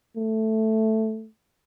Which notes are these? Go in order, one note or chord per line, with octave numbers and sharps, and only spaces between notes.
A3